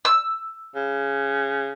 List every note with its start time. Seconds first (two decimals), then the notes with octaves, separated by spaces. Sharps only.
0.05 E6
0.76 C#3